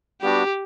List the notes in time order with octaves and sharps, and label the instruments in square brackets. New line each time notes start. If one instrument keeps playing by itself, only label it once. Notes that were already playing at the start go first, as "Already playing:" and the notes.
[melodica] G3 B3 D4 F#4 [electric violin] G4